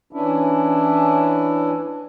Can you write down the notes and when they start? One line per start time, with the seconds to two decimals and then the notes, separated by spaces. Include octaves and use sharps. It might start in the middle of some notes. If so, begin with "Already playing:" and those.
0.13 E3 C#4 D4 E4